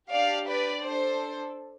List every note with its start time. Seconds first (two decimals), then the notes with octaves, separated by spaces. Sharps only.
0.12 D4 G4 D5 F5
0.48 B4 D5
0.85 D4 A4 C5